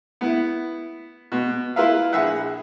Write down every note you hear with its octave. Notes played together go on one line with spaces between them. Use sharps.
B3 E4
B2
E4 F4 A#4 B4 E5 F5
A#1 G#4 E5 F#5 F#6